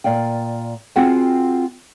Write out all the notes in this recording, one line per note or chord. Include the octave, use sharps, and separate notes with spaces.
A#2 D5 F5 G5
C4 F4 F#4 G#4 F#5 G5